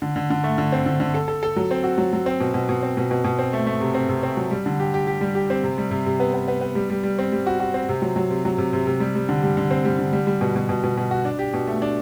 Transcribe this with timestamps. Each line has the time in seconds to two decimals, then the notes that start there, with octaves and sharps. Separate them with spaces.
0.02 D3
0.16 D3
0.30 D3
0.44 A3
0.58 D3
0.72 C4
0.86 D3
1.00 D3
1.14 A4
1.28 A4
1.43 A4
1.56 F#3
1.71 C4
1.84 F#4
1.98 F#3
2.13 F#3
2.26 C4
2.40 B2
2.54 B2
2.69 B2
2.83 C4
2.97 B2
3.11 B2
3.24 B2
3.39 C4
3.53 A3
3.66 A3
3.81 C3
3.94 C4
4.09 C3
4.23 C4
4.37 F#3
4.51 G3
4.66 D3
4.80 G4
4.94 G4
5.07 G4
5.21 G3
5.35 G4
5.50 C4
5.64 C3
5.78 G3
5.91 C3
6.06 C3
6.20 B3
6.34 B3
6.48 B3
6.61 B3
6.75 G3
6.90 G3
7.03 G3
7.19 C4
7.32 G3
7.47 F#4
7.60 F#4
7.74 C4
7.89 C3
8.02 F#3
8.16 F#3
8.30 C3
8.45 F#3
8.58 C3
8.73 C3
8.87 C3
9.00 G3
9.15 G3
9.29 D3
9.43 G3
9.57 D3
9.71 C4
9.85 G3
9.99 D3
10.13 G3
10.27 G3
10.41 B2
10.56 B2
10.69 B2
10.84 B2
10.97 B2
11.11 F#4
11.25 D4
11.39 G4
11.54 B2
11.67 A3
11.82 D4